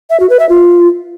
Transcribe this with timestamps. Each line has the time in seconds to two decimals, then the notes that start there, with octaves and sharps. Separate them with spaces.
0.10 E5
0.20 F#4
0.30 B4
0.39 E5
0.49 F4